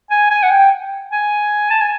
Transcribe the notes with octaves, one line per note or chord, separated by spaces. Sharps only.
G#5
G#5
F#5
G5
G#5
A5
G#5